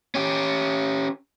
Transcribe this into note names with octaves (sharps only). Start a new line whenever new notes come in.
C#4 G4